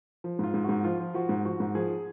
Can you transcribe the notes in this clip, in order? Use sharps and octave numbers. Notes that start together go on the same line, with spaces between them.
F3
G#2 F4
G#2
G#2 F#4
F3 F4
F3
F3 F#4
G#2
F3 F#4
G#2
F3 G#4